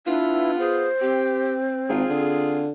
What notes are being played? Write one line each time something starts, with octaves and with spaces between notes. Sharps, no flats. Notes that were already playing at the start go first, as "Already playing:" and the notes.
B3 D4 E4 F4
G#4 C5
C4 G4
G#1 F4 G#4
D3